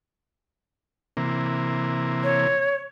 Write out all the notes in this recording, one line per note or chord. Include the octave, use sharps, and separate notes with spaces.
C3 E3 A#3
C#5